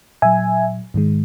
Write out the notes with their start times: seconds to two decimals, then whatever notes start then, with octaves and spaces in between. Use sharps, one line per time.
0.22 A#2 F#3 E5 G#5
0.94 G#2 D#3 G#3